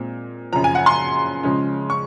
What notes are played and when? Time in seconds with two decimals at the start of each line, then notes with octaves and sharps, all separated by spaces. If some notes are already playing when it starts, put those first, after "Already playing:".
Already playing: A#2 G#3 C4
0.53 F#2 C#3 F3 A#5
0.64 G#5
0.75 F#5
0.86 C6
1.43 C#3 F3 G#3 C#4
1.90 C#6